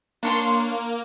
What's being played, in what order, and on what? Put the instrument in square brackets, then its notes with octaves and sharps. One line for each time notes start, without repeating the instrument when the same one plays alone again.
[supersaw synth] A#3 [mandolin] D4 C#5 C6